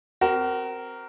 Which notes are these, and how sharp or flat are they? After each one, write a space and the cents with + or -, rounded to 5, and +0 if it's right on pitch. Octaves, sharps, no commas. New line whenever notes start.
C4 +0 F#4 +40 A#4 +0